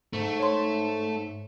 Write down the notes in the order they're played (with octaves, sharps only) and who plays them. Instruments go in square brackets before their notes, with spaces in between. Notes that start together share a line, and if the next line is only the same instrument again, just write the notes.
[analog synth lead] G#2 [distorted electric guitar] A3
[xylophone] C#5 C6